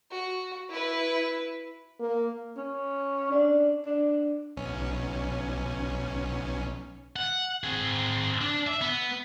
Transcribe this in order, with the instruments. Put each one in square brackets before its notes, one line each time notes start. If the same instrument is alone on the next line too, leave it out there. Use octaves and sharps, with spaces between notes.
[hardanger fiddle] F#4
E4 B4
[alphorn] A#3
[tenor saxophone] C#4
D4
D4
[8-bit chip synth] B1 C#4
[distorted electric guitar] F#5
C4 G#4
D4
E5
B3